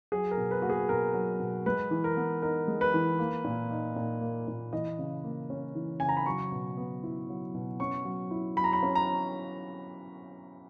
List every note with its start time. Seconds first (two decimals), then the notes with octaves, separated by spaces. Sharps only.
0.12 F#3 G#4
0.31 A#4
0.37 B2
0.51 B4
0.62 A#3 F#4
0.70 G#4
0.89 B2 A#4
1.14 F#3
1.39 B2
1.66 G#3 B4
1.91 E3
2.04 A#4
2.17 B3
2.42 D#4 A#4
2.68 G#3
2.81 B4
2.94 E3
3.19 A#3
3.44 A#2
3.71 D#4
3.96 A#2
4.21 A#3
4.48 A#2
4.73 E3 D#5
4.99 C#3
5.24 A#3
5.50 C#4
5.75 E3
6.00 C#3 G#5
6.09 A#5
6.17 B5
6.26 F#3 C#6
6.52 B2
6.77 B3
7.03 E4
7.29 F#3
7.54 B2
7.80 C#4 C#6
8.05 F#3
8.31 E4
8.56 F#3 B5
8.64 A#5
8.73 B5
8.83 C#4
8.95 A#5